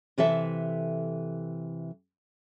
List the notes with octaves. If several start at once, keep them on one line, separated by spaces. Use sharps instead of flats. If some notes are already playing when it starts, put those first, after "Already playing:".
C3 E3 A4 E5